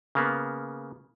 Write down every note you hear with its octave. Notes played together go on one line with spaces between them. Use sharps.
C#3 A#3 B3